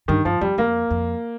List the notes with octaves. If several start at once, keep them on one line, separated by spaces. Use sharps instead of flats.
G2 D#3
G2 F3
F2 G3
F2 A#3
F2